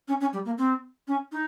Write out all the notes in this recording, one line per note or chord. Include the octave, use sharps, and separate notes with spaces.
C#4
C#4
G3
A#3
C4
C#4
D#4